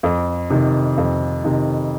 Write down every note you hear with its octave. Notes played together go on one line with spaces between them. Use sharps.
F2
C3 D#3
F2
C3 D#3